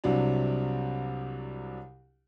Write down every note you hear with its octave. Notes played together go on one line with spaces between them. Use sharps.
C2 C3 F#3 D4